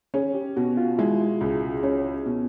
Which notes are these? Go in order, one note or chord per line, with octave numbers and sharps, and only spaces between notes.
C#4 G#4
G4
B2 F#4
F4
G#3 E4
C#2
C#4
B2